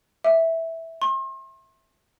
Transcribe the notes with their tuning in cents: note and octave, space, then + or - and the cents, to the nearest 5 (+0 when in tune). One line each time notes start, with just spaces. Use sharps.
E5 -10
C6 +40